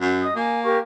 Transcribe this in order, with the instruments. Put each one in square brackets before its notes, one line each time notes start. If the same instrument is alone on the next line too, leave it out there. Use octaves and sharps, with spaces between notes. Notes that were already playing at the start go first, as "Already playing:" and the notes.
[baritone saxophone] F#2
[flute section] D#5 D#6
[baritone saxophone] A#3 [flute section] G#5
[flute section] G4 A#4 C#6